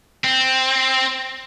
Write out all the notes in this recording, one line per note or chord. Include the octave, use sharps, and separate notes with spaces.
C4